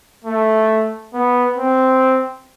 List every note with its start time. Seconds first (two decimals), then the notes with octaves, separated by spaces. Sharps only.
0.24 A3
1.13 B3
1.58 C4